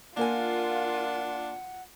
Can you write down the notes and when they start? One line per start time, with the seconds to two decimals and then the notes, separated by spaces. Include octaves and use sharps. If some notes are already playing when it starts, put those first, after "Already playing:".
0.17 A#3 D4 F4 A#4 F#5 G#5